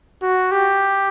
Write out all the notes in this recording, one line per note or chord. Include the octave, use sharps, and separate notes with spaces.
F#4
G4